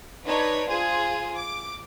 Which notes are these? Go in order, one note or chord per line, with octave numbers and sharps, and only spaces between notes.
D4 D#4 B4 C#5
F4 G#4 C5
D6